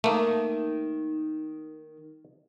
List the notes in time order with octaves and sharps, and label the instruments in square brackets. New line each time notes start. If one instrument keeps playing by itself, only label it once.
[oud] D#3 [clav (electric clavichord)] A3 A#3